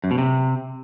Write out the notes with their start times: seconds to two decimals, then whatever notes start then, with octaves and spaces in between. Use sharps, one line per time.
0.04 F#2
0.11 B2
0.18 C3